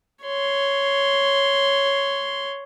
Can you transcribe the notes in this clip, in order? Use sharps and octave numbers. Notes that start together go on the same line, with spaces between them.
C#5 C6